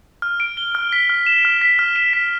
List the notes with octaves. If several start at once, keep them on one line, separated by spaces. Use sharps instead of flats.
F6
D7
G7
F6
B6
F6
E7
F6
B6
F6
E7
B6